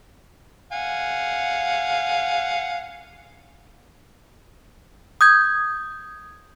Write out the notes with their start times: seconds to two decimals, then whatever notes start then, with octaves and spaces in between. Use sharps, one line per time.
0.73 F5 F#5 G#5
5.21 D#6 G6 G#6